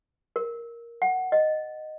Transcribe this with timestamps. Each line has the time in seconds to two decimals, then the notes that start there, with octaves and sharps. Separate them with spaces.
0.36 A#4
1.02 F#5
1.32 D#5